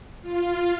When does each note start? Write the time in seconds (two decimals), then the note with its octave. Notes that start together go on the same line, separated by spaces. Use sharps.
0.22 F4